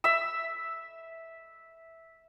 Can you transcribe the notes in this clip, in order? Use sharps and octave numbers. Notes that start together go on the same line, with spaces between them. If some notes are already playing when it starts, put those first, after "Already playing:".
E5 E6